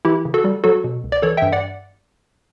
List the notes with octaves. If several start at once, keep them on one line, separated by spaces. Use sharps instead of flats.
E3 E4 G4
C#3
F#4 A4
G3
F#3 F#4 A4
B2
C#2
D5
E3 A4 C#5
G2 E5 G5
D5 F#5